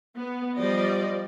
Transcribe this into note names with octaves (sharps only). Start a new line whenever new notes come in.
B3
F3 G3 G4 D5 D#5